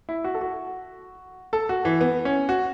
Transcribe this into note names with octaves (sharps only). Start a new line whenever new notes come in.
E4
F#4
A4
F#4
A4
F#4
E3
B3
C#4
F#4